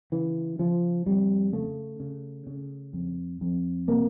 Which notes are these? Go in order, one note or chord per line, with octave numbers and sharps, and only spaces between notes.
C#3 E3
C#3 F3
F2 G3
C#3 A3
C#3
C#3
F2
F2
C3 A#3